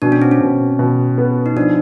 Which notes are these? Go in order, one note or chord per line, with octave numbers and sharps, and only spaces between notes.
B2 D4
C#4
C4
C#4
B2
B2
B3
D#4
F3 D4